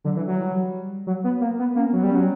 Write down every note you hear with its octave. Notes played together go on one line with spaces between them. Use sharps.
D3 F#3
E3
F#3
G3
F#3
B3
A#3
B3
A#3 C#4
B3
F#3
B3
G3
C#4
F#3